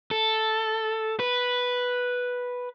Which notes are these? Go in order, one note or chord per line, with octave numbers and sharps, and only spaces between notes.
A4
B4